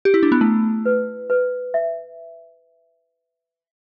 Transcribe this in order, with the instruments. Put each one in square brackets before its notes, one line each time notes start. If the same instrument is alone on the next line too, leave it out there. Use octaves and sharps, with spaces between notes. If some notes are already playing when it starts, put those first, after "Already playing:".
[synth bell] G4
E4
D4
B3
[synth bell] A3 [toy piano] E4
[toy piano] B4
B4
E5